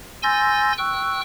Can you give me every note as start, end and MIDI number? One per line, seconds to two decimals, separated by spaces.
0.23 0.73 80
0.23 0.73 84
0.23 0.73 88
0.23 0.73 91
0.23 0.73 93
0.23 0.73 94
0.78 1.21 79
0.78 1.21 85
0.78 1.21 88
0.78 1.21 90